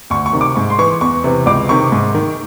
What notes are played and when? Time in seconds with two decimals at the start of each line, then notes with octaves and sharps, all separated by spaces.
0.10 D2 C#6
0.26 C#6
0.33 C3 D#3
0.41 D6
0.56 G#2 C#6
0.70 C6
0.79 E3 C#6
1.01 E2 C#6
1.24 C3 E3
1.46 C#2 D6
1.69 C3 D#3 C#6
1.92 G#2
2.15 D#3